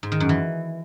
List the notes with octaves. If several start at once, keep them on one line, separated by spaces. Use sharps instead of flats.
G#2
D#3
F#2
E3